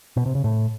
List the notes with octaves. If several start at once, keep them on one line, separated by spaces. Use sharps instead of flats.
B2
C3
C#3
A2